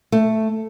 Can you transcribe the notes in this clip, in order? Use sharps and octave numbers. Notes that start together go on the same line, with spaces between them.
A3